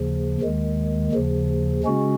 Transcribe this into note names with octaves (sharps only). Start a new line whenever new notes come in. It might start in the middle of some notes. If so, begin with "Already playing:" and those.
Already playing: D#2 C#3 F3
D#2 D#3 G#3
D#2 C#3 F3
C#3 G#3 C#4 F#4